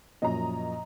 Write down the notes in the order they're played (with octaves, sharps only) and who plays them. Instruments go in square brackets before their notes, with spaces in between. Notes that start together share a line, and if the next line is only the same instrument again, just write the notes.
[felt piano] F#2 A#2 F3 [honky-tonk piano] D#5 A#5